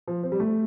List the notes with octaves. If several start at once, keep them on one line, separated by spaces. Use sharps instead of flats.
F3
C4
G3
A3